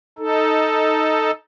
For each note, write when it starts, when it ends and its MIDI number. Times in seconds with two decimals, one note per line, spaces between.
0.19 1.31 63
0.19 1.31 69